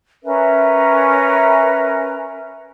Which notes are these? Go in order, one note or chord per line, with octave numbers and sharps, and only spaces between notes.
C#4 A#4 B4 E5